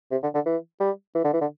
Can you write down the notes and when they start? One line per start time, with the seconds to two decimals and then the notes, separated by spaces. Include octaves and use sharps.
0.12 C3
0.23 D3
0.35 D3
0.46 E3
0.80 G3
1.15 E3
1.24 D3
1.33 E3
1.41 D3